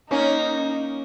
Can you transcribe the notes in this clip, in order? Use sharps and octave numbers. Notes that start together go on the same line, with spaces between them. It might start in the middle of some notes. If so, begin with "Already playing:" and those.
A#3 C#4 D#4